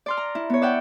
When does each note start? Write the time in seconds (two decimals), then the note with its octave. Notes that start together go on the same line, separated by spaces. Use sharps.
0.06 D5 C6 F6
0.17 A#5
0.35 E4
0.50 B3 C#5
0.62 D5 E5 F#5 G5